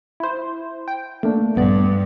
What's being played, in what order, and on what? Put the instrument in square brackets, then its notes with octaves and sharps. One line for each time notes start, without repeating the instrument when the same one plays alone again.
[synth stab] E4 C5
G5
A3 A#3 D4
[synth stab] A#1 B3 D5 [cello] G2